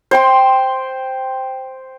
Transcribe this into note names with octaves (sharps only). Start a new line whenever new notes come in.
C5 G5 C6